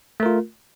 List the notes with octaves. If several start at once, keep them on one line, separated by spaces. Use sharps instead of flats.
A3 F4 A#4